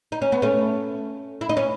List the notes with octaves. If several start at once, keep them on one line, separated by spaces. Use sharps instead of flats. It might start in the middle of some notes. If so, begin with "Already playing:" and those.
D#4
C#4
B3
A3 C#4
E4
D#4
C#4